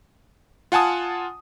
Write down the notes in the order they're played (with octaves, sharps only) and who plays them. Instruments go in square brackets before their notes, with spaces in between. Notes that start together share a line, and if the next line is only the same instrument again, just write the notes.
[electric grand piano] F4 F#5 G#5 A5 D#6